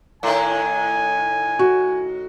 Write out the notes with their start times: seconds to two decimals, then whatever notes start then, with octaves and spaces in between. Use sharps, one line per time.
0.23 A2 D#3 G#5
1.59 F#4